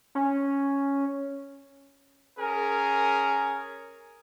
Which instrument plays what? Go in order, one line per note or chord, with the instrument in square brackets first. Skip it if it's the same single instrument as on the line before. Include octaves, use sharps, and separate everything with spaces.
[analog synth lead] C#4
[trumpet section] C#4 G#4 A#4 G#5